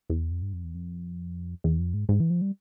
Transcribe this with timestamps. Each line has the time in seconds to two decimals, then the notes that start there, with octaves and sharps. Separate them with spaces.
0.09 E2
0.31 F2
0.42 G2
0.53 F2
0.64 E2
0.75 F2
1.64 E2
1.80 F2
1.94 G#2
2.09 G#2
2.20 E3
2.30 F3
2.41 G3